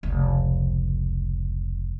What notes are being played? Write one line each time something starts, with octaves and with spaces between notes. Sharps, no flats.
F1 C#2